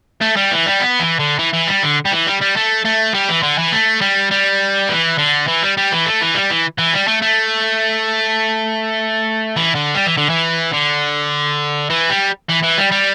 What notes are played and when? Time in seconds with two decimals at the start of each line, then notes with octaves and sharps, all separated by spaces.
0.22 A3
0.37 G3
0.52 E3
0.66 G3
0.80 B3
1.00 E3
1.20 D3
1.39 E3
1.54 E3
1.68 G3
1.83 D3
2.05 G3
2.12 E3
2.26 G3
2.41 G3
2.56 A3
2.85 A3
3.14 G3
3.28 E3
3.43 D3
3.58 E3
3.72 A3
4.01 G3
4.31 G3
4.89 E3
5.18 D3
5.47 E3
5.62 G3
5.77 G3
5.92 E3
6.06 A3
6.21 E3
6.35 G3
6.50 E3
6.78 E3
6.94 G3
7.08 A3
7.22 A3
9.57 E3
9.75 D3
9.95 G3
10.06 E3
10.17 D3
10.29 E3
10.72 D3
11.90 E3
12.10 G3
12.49 E3
12.63 E3
12.78 G3
12.91 G3